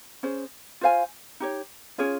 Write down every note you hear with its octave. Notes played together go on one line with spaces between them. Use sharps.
C#4 G#4 C5
F4 C5 F5 G#5
D#4 G4 C#5
C#4 F4 G#4 C#5